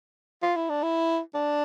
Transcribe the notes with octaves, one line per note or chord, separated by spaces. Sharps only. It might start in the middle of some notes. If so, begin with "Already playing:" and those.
F4
E4
D4
E4
D4